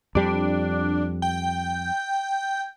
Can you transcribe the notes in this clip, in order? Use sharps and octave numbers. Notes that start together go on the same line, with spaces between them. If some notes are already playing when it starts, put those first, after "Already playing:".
F2 G3 D4
G5